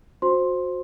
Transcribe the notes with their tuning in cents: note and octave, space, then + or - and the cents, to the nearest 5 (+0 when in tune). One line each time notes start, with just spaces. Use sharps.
F#4 -25 C5 +0 C6 +10